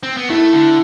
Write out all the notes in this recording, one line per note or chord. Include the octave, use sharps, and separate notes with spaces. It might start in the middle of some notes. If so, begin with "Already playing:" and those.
C4
B3
A3 E4
D3